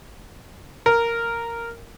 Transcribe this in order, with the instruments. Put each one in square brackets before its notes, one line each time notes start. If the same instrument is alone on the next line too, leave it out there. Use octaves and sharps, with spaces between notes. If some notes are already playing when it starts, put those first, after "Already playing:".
[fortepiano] A#4